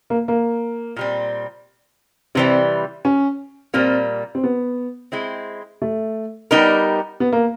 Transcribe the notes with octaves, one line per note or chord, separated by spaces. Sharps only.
A#3
A#3
A#2 G3 C4
C3 E3 G3 C4
C#4
A#2 G3 A#3 C4
C4
B3
G#3 C4 E4
A3
G3 B3 D#4 G4 A#4
B3
A#3